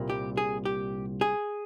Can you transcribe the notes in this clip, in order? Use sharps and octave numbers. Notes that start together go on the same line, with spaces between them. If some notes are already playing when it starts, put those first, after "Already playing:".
Already playing: C2 A#2 G3 A#3
G4
G#4
G4
G#4